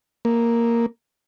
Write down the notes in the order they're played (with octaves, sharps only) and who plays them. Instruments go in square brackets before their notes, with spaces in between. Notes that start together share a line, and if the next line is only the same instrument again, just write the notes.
[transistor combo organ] A#3